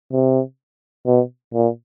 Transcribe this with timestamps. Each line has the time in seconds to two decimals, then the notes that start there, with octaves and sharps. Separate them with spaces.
0.12 C3
1.06 B2
1.53 A#2